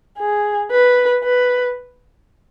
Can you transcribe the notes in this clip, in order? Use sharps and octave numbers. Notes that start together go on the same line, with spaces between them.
G#4
B4
B4